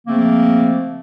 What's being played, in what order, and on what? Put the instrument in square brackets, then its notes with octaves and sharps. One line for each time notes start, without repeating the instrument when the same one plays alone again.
[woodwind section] C#3 F3 A3 A#3 C4